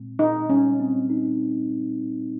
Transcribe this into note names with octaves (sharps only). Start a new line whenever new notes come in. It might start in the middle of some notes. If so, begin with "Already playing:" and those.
Already playing: A#2 G#3 C4
A#2 D#4
G3 C#4
C4
D#4